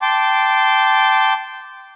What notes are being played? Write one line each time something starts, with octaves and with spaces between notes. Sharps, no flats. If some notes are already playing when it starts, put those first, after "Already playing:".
G5 A5 C6 D6